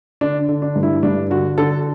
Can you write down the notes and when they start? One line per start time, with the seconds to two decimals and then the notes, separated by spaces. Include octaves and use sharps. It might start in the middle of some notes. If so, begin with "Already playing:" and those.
0.21 D3 D4
0.49 D3
0.62 D4
0.76 G2
0.83 E4
1.03 G2 D4
1.30 D3 F#4
1.58 D3 A4